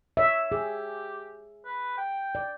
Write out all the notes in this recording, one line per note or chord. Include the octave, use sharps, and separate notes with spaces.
C#5 E5
G4 G#4
B4
G5
D5